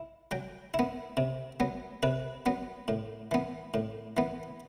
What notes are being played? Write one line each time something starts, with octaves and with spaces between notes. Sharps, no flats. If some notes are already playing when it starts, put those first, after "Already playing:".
Already playing: E4
F#3 G5
E4
B3
C3
F#3 B3
C3 B4
F#3 B3
A2
E3 B3
A2
E3 B3